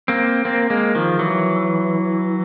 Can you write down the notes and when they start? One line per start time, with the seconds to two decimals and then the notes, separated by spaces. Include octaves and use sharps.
0.08 A#3 C4
0.45 A#3 C4
0.70 G#3 A#3
0.95 D#3 F3
1.19 E3 F#3